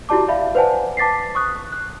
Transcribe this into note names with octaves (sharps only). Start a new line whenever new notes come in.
E4 F#4 G4 D5 A5 D6
D5 E5 F5 B5
B4 C5 D5 F#5 G#5 A5
A5 D6 A6 B6 C7
C#6 D#6 F#6
F#6